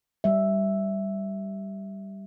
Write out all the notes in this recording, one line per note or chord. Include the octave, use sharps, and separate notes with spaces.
G3 E5